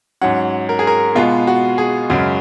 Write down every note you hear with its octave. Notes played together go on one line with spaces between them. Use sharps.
G#2 F#3 C#4 F#5
A#4
G#4
A#4
B2 G#3 B3 F4
F#4
G#4
F#2 C#3 G#3 F#4